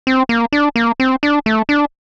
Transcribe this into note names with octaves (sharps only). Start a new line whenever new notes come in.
C4
A#3
D4
A#3
C4
D4
A3
D4